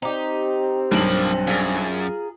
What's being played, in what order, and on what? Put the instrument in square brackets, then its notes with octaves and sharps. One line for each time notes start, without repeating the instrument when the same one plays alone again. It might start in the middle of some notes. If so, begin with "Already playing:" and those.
[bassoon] C4 [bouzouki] D#4 G4
[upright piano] B1 G2 F#7 [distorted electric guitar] F3 A#3
[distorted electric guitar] F#2 [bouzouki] F4 G#4 A#4